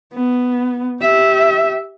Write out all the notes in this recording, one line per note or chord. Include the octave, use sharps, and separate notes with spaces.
B3
G4 E5